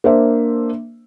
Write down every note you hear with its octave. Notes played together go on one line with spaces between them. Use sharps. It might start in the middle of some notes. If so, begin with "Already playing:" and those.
A#3 D4 C5 E5